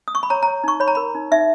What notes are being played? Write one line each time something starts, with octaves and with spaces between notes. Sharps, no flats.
D#6
C#6
B5
C#5 A#5
C#5 A#5
D#4 C#6
C#5 B5
A#5
A#4 B5
D#4
D#4 E5